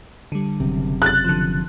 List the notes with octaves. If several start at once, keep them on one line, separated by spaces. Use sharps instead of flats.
D3 G3
F#1 F#2 C3
F#6 A6
D3 F3